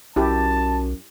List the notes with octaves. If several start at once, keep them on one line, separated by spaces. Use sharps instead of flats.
B1 F#2 E4 G4 A5